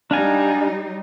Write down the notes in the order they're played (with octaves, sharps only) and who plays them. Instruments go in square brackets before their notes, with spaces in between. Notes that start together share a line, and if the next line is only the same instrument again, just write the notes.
[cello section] G3 D#4 [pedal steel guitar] D4 F5 G#5